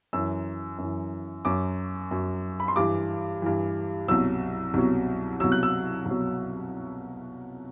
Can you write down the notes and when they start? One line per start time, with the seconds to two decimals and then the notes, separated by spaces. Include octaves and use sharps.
0.13 F#2 E3 E6
0.78 F#2 E3
1.45 F#2 F#3 D6
2.11 F#2 F#3
2.60 B5
2.68 C6
2.76 G2 E3 D6
3.42 G2 E3
4.08 C2 B2 F#3 E6
4.74 C2 B2 F#3
5.40 C2 B2 F#3 E6
5.52 F#6
5.63 E6
6.06 C2 B2 F#3